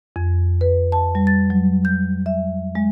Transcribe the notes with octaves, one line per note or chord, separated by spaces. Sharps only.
F2
B4
A5
G3
A6
F#3
G6
E5
G#3